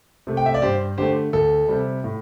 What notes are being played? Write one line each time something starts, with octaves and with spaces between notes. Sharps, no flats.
C3 A3
G5
E5
D5
G2 G4 C5
D3 A3 G4 C5
D2 A4
C3 G3
A2